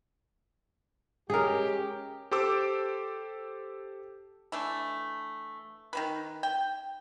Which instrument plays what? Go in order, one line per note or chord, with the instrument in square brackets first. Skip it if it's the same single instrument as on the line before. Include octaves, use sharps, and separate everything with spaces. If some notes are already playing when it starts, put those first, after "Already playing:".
[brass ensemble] G#3 C#4 G4 [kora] G#4 A#4
[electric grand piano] G4 A4 C5 D6 E6
[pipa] E3 A3 D4
D#3 F#3 B4
G5